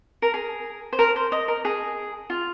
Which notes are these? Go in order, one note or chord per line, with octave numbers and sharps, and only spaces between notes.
A#4
G#4
C5
A#4
C5
D#5
A#4
G#4
F4